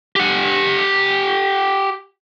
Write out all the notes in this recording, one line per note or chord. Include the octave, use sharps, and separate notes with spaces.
G4 F#5